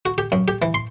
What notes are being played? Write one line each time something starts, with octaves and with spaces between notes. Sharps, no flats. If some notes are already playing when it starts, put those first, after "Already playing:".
F#4
G4
F#2
G4
E3
C6